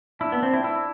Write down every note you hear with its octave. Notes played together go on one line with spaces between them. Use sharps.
D4 E4
B3
C4
E4
E4